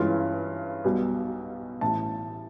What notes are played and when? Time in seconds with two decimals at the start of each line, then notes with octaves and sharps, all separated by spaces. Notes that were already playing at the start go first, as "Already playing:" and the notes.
Already playing: G2 E3 G#3 C#4 F4
0.84 B1 B2 G3
1.81 A1 A2 E3 A5